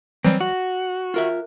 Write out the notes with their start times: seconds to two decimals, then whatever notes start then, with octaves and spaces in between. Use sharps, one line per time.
0.24 E3 F#3 G3 C4
0.41 F#4
1.14 F4 A#4 E5